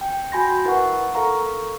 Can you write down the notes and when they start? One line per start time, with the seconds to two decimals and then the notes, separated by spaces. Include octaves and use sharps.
0.01 G5
0.32 F#4 G#5 B5 C6 G6 A#6
0.65 E4 A#4 B4 F#5 C#6
1.14 A4 A#4 F5 A#5 C#6